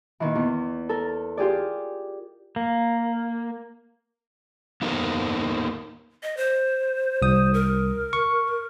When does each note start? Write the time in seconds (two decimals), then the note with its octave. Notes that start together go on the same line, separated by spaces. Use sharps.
0.20 A#2 D#3 E3
0.35 E2
0.89 A4 A#4
1.37 F4 G4 G#4 D5
2.56 A#3
4.82 A#3 B3 D#4 A4 A#4 C5
6.23 D#5
6.37 C5
7.22 C2 D#6
7.54 A#4
8.13 C#6